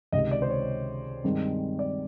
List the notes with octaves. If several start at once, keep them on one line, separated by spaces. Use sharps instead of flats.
C#2 C3 D#3 D#5
D5
C5
C#5
G2 D#3 G#3 C4
D5